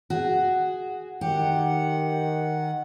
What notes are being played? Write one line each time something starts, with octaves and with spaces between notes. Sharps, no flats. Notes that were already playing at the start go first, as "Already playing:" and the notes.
F#4 G#4
D#3 G4 F#5